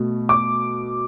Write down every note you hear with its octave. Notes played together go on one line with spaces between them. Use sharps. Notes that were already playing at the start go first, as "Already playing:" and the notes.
Already playing: B2 A3
D6